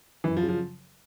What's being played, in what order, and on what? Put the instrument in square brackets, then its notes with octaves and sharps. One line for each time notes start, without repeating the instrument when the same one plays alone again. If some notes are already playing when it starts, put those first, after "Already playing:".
[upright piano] F#2 [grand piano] E3
[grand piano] F3
[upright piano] C#3 F#3
[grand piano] F3